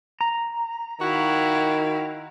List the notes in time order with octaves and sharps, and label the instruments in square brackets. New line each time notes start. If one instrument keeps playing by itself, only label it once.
[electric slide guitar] A#5
[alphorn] D#3 [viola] E4 F5 [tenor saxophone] F#4